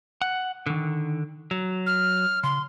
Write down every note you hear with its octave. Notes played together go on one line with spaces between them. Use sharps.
F#5
D3 D#3
F#3
F6
C#3 C6